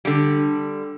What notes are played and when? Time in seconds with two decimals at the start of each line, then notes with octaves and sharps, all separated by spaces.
0.05 D3 G3